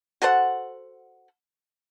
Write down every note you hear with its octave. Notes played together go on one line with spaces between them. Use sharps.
F#4 A4 C5 F#5